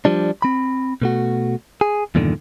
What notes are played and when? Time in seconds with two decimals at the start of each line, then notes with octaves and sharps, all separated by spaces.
0.05 F3 G3 D4
0.42 C4 B5
1.02 B2 A3 F#4
1.81 G#4
2.15 E2 G2 A#2 D3 D#3